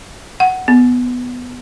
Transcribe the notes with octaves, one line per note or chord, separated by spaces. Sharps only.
F#5
B3